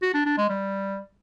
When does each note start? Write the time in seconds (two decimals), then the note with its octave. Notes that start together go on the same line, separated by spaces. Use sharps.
0.02 F#4
0.14 D4
0.26 D4
0.38 G#3
0.49 G3